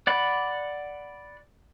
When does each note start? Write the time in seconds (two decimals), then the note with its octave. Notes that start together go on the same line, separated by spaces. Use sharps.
0.07 D5 F#5 B5